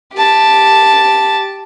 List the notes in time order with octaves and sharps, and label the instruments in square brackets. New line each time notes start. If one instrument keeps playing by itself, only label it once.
[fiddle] G4 A5